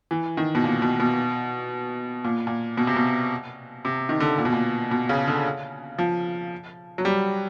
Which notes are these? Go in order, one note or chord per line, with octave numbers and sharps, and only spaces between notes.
E3
D#3
B2
A#2
B2
B2
A#2
A#2
B2
C3
B2
C3
D#3
D3
A#2
B2
A#2
B2
C#3
D3
F3
F#3
G3